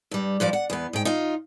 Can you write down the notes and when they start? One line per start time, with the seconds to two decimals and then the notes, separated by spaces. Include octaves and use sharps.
0.11 G2 G3
0.40 G2 F3 G3 D5
0.53 F#5
0.70 E2 B3
0.93 G#2 G5
1.05 D#4 F4